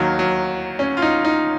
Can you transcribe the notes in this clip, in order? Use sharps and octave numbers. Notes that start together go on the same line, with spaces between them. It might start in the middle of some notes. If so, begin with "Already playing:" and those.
Already playing: D#2 D#3 F#3
F#3
C#4
F4
D#4
D#4